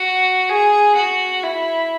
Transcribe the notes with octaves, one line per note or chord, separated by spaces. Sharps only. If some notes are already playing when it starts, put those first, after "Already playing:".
Already playing: F#4
G#4
F#4
E4